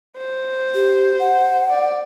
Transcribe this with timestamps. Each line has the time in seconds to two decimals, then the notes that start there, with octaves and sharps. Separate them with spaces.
0.17 C5
0.75 G4
1.20 F#5
1.70 D5